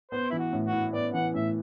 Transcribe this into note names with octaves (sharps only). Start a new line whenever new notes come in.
B3 C5
E3 E4
F#4
A2
F#4
E4
B3 D5
E3 F#5
A2 E5